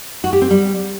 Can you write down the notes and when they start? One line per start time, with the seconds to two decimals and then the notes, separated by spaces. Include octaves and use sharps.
0.24 F#4
0.33 G4
0.42 C4
0.50 G3